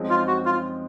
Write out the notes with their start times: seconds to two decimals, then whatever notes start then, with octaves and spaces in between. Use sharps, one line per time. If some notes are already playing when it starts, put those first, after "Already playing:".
Already playing: F#2 F3 G#3 C4 D#4
0.10 F4
0.27 F#4
0.45 F4